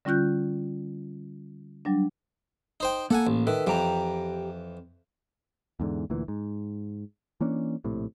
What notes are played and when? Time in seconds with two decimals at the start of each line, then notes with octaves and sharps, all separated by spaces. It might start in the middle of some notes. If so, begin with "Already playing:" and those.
0.05 D3 G3 C#4 F4 F#6 G6
1.85 F#3 G3 D4
2.80 D#4 C5 G5
3.11 A#3 A4 F#5 G#5
3.27 A1
3.47 D#3 A4 B4 E5
3.67 F2 E3 G4 G5 A#5
5.80 E2 G#2 D3
6.10 D2 A#2 E3
6.28 G#2
7.41 E3 A#3 C#4 D4
7.84 A#1 A2 C3